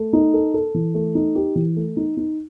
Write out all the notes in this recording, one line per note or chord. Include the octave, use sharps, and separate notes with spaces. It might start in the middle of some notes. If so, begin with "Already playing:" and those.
Already playing: A3
D#4
A4
A4
E3
A3
D#4
G4
E3
A3
D#4
D#4